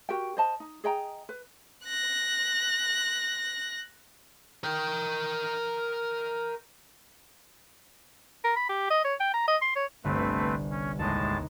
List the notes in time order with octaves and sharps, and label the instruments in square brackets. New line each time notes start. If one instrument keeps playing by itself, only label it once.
[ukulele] F#4 G4 A#4 G5
C5 D#5 A5
D#4
G#4 D#5 G5 A#5
B4
[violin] F#6 A#6
[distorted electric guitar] A#4 G5
[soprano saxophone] A#4
B5
G4
D#5
C#5
G5
A#5
D#5
C6
C#5
[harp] G1 C2 [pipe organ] A3 C4 B4
[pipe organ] C#4
[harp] D#2 D#5 [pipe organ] A2 G#3 A5